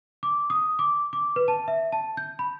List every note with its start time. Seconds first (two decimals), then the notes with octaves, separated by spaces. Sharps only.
0.23 D6
0.50 D#6
0.79 D6
1.13 D6
1.36 B4
1.48 A5
1.68 E5
1.92 A5
2.17 G6
2.39 B5